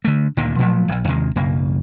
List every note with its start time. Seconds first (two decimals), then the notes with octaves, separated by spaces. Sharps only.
0.05 D3 A3
0.37 D2 A#2 D3 D#3
0.59 A#2 F3 F#3 A3
0.88 D1 A#1
1.07 D#2 C3 D#3 G#3
1.36 B1 F#2 C#3 A#3